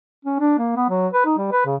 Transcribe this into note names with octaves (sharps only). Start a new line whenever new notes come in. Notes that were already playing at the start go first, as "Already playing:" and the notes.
C#4
D4
A#3
B3
F#3
B4
D#4
G3
B4
C#3